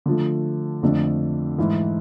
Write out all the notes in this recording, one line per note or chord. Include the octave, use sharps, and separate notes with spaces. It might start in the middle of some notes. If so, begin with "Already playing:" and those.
D3 F3 A3
F2 D3 F3 A3 D4
G#2 E3 A3 E4